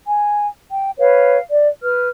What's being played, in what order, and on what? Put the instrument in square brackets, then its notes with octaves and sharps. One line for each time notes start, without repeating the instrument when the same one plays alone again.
[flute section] G#5
G5
B4 C#5 F5
D5
B4 F6